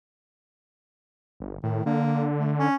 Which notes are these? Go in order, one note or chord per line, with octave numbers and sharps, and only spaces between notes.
G1
A2 D#3
D3 A#3
A3
C#4